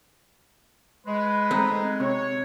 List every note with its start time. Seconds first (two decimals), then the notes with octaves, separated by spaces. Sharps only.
1.07 G#3 B4
1.51 A3 C4 D#4
2.00 C3 C#5